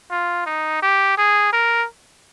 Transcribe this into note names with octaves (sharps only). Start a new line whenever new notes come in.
F4
D#4
G4
G#4
A#4